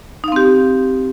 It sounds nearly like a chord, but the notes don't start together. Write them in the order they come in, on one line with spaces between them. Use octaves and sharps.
D#4 F5 C4 G4